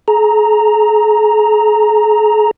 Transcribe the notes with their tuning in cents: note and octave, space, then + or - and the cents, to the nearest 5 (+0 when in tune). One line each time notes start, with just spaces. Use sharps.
G#4 +40 A#5 +0